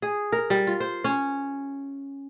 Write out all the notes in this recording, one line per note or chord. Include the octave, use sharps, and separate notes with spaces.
G#4
A#4
G3
F4
C5
C#4